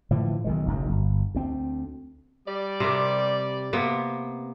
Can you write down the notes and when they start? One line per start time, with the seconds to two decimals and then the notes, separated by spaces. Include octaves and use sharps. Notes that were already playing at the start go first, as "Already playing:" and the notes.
0.11 A2 D3 E3 F3
0.44 B1 D#3 G#3
0.66 F#1 B1 F#2
0.89 G1
1.34 D2 C4
2.47 G3 D5
2.80 C3 A#4
3.73 C3 A#3 B3